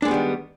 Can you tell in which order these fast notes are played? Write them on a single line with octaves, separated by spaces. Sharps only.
D4 G#3 B3 G3 D#3